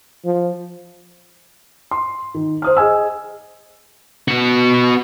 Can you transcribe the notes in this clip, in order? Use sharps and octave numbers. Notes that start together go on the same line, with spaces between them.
F3
C6
D#3
C5 D#6 F6
G#4 D#5 G#5 E6
B3 F#4